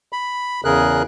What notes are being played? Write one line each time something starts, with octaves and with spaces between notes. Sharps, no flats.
B5
E2 C#3 G#4 A#4 F#6